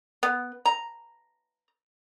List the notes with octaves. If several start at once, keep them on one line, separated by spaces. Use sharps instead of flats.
B3
A#5